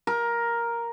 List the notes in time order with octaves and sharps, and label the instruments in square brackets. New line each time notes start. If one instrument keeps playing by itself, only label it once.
[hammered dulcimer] A#4